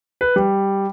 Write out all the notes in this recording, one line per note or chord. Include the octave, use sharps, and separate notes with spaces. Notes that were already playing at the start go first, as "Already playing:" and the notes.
B4
G3